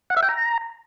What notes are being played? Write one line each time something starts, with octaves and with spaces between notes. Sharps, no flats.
F#5
E5
G5
A#5